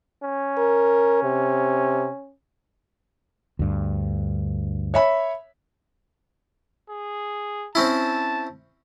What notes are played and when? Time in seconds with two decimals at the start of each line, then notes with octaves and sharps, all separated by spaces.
0.23 C#4
0.58 A#4
1.23 C3
3.59 D2 G2
4.94 C#5 E5 B5
6.90 G#4
7.75 C4 C#4 E4 A5